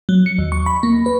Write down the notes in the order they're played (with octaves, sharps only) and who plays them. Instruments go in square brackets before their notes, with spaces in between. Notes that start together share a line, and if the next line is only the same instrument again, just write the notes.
[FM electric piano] F#3
C#7
D#2
C#6
B5
A#3
B4